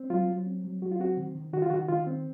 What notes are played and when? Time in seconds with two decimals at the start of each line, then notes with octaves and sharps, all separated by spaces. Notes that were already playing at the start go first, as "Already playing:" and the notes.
Already playing: C4
0.10 F#3 F4
0.28 F#3
0.47 C4
0.64 F#3
0.82 F#3 F#4
0.91 F4
0.99 C4 F#4
1.17 D#3
1.35 D#3
1.53 D#3 F#4
1.62 F4
1.70 D#3 F#4
1.88 D#3 F4
2.07 C4